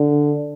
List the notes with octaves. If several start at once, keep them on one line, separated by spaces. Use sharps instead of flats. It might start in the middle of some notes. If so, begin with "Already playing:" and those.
Already playing: D3